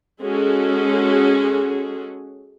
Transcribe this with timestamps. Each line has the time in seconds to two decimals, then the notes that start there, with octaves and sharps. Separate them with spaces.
0.22 G#3 C#4 F#4 G#4 A4